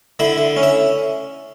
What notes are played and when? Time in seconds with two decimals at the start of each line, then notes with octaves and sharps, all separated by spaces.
0.19 D3 E4 E5
0.38 D3
0.57 C#4
0.63 E5